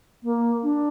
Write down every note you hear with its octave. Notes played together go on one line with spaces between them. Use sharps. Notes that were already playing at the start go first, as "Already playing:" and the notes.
A#3
D4